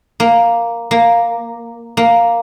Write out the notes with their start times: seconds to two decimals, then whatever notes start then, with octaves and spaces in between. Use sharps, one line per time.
0.20 A#3
0.91 A#3
1.97 A#3